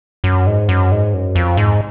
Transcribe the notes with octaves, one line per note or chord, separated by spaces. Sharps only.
F#2
G#2
F#2
G#2
F#2
F2
G#2